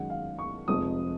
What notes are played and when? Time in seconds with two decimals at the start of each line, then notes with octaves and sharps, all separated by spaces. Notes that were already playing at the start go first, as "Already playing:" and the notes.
Already playing: F#2 D#3 G#3 F#5
0.10 F5
0.39 C#6
0.68 F1 F2 C3 F3 G#3 D#6